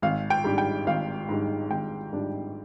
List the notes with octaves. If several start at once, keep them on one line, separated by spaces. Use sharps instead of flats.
G#1 F5
G5
G#2 G3 D4
G5
G#1 F5
G#2 G3 D4
G#1 G5
G#2 G3 D4